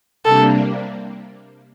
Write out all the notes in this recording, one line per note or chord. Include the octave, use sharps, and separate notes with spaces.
C3 G3 A#3 D4 A4